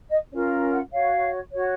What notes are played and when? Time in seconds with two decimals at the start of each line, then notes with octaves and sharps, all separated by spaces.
0.10 D#5
0.30 C#4 F4 A#4 C#5
0.71 F#5
0.91 F#4 C#5 F5
1.51 F#4 C#5